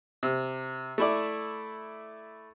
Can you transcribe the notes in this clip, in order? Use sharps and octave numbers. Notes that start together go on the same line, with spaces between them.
C3
A3 E4 D5